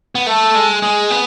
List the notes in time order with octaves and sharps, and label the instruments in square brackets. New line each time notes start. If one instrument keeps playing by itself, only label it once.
[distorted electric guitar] B3
[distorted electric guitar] A3 [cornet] A4
[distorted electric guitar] G#3
[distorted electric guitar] G#3 [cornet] G#4
[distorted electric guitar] B3